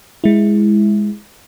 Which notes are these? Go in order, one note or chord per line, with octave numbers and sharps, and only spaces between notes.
G#3 E4